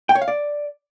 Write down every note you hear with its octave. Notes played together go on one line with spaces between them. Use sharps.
G5
C#5
F5
D5